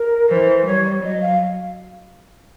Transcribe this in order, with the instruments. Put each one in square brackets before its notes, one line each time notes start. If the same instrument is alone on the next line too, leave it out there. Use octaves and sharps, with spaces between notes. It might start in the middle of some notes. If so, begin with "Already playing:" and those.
Already playing: [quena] A#4
[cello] E3 [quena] C5
[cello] G3 [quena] C#5
[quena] D5
[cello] F#3 [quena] D#5
[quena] F5